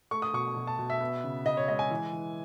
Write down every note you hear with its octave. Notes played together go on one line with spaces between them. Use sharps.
A3 C#6
D#6
B2 C#6
B2
A5
B2
E5
B3
C#3
C#3 D#5
C#5
G#3 D#5
G#5
E3
E3